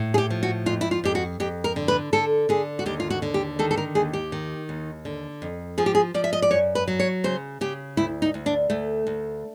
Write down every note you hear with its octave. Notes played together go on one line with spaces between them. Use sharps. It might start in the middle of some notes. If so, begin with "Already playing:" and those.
Already playing: A2
G#4
G4
F3
F#4
F2 F4
E4
F4
F2 G4
F#4
F2 G4
A#4
D3
B4
D3 A4
D3 G#4
F#4
D#2 G4
F4
F#4
D3
G4
D#3 A4
A4
A#4
D#2 G#4
G4
D#3
D#2
D3
F2
F3 G#4
G4
G#4
F3 D5
E5
D#5
D5
F#2 C#5
B4
F#3
C#5
C#3 C5
C#3 G4
D2 E4
D#4
D2
D4
D2 A3
D2